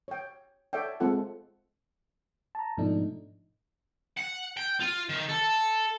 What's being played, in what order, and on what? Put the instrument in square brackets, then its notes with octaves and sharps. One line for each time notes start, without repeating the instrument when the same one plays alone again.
[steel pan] C#5 G5
A4 C#5 D5 E5 F#5 G5
G#3 C4 F4 A4 F#5
[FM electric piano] A5 A#5
G#2 B2 F3 A3 D4 D#4
[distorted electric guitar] F#5
G5
F4
D#3
A4